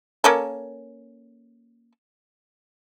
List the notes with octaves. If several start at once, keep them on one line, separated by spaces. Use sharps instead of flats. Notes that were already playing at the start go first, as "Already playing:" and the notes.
A#3 C#4 A4